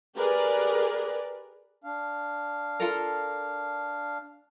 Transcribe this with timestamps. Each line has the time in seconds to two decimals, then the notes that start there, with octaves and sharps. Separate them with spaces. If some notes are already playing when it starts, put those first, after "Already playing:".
0.15 G4 G#4 A#4 B4 D5
1.84 D4 F5
2.80 F4 A4 A#4